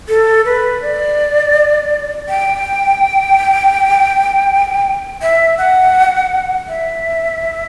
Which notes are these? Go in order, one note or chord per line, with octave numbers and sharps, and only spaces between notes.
A4
B4
D5
G5
E5
F#5
E5